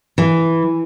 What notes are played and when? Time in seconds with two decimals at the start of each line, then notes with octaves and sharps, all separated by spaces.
0.18 E3